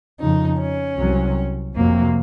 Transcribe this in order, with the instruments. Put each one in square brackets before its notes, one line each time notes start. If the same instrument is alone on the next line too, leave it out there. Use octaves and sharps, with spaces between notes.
[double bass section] F2 C#3 F3 [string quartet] D#4
[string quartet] C#4
[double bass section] C2 C3 F#3
[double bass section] F1 F2 C3 F#3 [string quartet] A#3